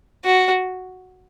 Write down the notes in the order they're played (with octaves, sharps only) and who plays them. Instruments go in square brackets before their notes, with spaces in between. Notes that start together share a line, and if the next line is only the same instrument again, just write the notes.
[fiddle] F#4